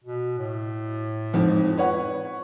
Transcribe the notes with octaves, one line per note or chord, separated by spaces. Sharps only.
B2
A2
F2 G#2 F3
B4 C#5 F#5